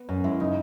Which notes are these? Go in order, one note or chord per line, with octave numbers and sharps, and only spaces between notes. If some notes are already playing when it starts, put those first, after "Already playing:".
Already playing: B3
F#2 C#4
G#3 E4
C#3 D#4